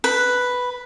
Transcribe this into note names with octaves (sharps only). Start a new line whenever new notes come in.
B4